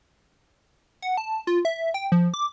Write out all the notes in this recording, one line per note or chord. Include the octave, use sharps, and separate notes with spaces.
F#5
A5
F4
E5
G5
F3
D6